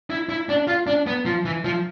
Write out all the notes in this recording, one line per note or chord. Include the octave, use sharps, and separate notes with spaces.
E4
E4
D4
F4
D4
B3
F3
E3
F3